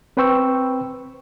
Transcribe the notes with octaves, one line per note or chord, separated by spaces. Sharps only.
C4 B4 C5 G5 C#6 E6